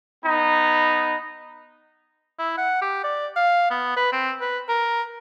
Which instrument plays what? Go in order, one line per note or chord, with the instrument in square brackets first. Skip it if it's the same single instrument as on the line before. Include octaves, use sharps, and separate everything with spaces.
[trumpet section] B3 D#4
[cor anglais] E4
F#5
G4
D5
F5
B3
B4
C4
B4
A#4